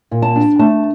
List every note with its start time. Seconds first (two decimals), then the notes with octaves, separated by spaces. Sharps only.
0.11 A#2
0.22 A5
0.36 D4
0.59 A3 A5